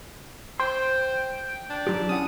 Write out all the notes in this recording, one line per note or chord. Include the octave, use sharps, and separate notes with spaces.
C5 G5 C6
D4
F#3 F4 G4
C#4 E4 F#5 D#6